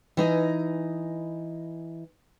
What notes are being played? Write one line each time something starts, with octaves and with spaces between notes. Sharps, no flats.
E3 D#4 D#5